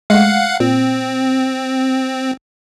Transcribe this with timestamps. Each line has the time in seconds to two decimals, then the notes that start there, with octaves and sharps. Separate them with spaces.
0.10 G#3 A3 F5 F#5 F#6
0.60 A#2 C4